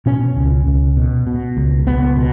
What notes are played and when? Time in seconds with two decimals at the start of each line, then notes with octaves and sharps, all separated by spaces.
0.06 B2 C#4
0.37 C#2
0.67 C#2
0.97 B2
1.27 B2
1.57 C#2
1.87 C#2 B3
2.17 B2